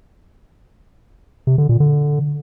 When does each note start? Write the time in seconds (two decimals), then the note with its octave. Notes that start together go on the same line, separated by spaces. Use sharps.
1.47 C3
1.58 D3
1.69 A#2
1.80 D3